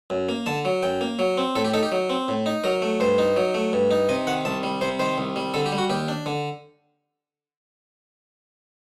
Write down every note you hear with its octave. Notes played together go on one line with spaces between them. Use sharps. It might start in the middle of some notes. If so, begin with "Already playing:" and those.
F#2
A#3
D3 A5
F#3
F#2 G5
A#3
F#3
C4
A2 A4
G4
D#4 A4
G4
F#3
C4
A2
D#4
F#3 A#4
A3
G2 C5
D#4
F#3
A3
G2
D#4
C3 D#5
D#3 F#5
C2 A5
G3
C3 C5
D#3 C5
C2
G3
D3 A4
G4
G3
F#4
D#2 G4
D4
D3